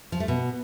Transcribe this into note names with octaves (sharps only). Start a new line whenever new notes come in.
F3
A3
B2